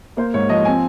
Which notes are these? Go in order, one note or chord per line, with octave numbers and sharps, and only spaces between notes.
A#3 C5
G#2 C#5
F3 D#5
C4 G#5